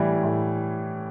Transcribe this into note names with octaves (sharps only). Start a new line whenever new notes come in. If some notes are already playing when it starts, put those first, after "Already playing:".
Already playing: A2 E3 G3
A2